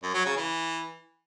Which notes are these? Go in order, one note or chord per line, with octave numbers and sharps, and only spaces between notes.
F#2
F#3
C#3
E3